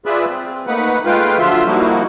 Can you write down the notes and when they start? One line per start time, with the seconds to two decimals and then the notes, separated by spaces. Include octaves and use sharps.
0.06 F4 G#4 B4 D5 E5 B5
0.28 C4
0.67 A3 A#3 D#4 B4 F#5 B5
1.05 G#3 A3 F4 B4 F5 G5
1.39 D3 F3 F#3 F4 E5 C6
1.66 F3 G3 A#3 D#4 E4 F#4